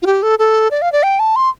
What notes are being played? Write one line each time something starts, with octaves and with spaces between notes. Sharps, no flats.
F4
G4
A4
A4
D5
F5
D5
G5
A5
C6